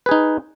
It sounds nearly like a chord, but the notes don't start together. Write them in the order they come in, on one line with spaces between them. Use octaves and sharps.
B4 G#4 D#4